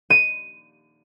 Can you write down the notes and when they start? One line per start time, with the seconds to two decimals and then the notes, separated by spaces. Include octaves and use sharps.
0.10 D#7